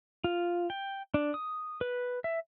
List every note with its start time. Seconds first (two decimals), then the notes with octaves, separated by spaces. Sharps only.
0.24 F4
0.70 G5
1.14 D4
1.34 D#6
1.81 B4
2.24 E5